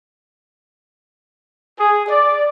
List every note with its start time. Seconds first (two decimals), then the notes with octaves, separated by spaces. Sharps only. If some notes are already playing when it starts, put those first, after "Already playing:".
1.78 G#4
2.09 D5